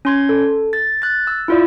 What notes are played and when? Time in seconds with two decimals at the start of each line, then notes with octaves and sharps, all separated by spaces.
0.05 C#4 C6 G#6
0.29 A4
0.73 A6
1.02 F#6 A6
1.27 E6
1.48 E4 F4 D5